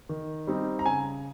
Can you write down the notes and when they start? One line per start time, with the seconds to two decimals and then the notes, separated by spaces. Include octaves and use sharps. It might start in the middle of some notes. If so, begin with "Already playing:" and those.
0.09 D#3
0.47 G3 C4 D#4
0.79 A#5
0.86 C#3 G#5